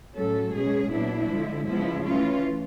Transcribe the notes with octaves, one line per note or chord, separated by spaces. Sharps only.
A2 F#3 A3 C#4 A4
B2 G#3 C#4 G#4
A#2 F#3 B3 D4 E4
D3 F3 G#3
C#3 F3 G#3 B3 E4
E3 A3 C#4 F4